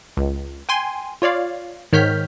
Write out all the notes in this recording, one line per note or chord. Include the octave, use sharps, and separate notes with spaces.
C#2
G5 G#5 C6
F4 C#5 D5 F5
G#2 D#3 C#5 F6 G6 B6